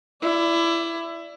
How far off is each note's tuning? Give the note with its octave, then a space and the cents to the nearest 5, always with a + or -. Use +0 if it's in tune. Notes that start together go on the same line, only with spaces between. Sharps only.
E4 +20 D5 +0